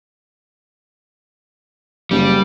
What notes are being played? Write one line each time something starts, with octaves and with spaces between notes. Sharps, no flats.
F#1 G3